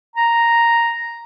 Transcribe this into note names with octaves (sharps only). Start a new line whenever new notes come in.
A#5